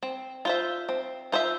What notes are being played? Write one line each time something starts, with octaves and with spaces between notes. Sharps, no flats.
C4
F4 C5 E5
C4
F4 C5 E5